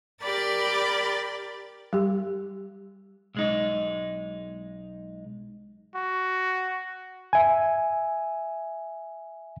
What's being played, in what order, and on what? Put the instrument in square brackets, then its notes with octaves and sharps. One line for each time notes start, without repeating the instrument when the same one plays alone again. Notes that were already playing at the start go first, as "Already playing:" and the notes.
[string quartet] G4 A#4 D5 B5 A6
[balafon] G3 G4
[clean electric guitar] B1 G#3 D#4
[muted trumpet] F#4
[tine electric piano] E5 G#5